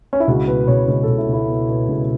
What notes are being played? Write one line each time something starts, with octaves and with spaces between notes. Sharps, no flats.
C#4
E4
C#2 F#4
B2 B4
C#2 C#5
C#2
A4
C#2
E4
C#2 E4
B2
B2
C#2